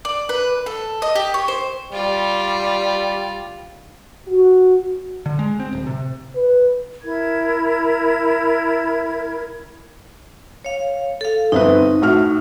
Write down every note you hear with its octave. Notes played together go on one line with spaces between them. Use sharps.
D5
B4
A4
D#5
G4
C#5
C5
G3 F4 D5
F#4
D3
G#3
C4
D1
C3
B4
E4 A#4 G#6
C#5 F5
A4 F5
G1 C4 D#4 B4
A2 F#4 F6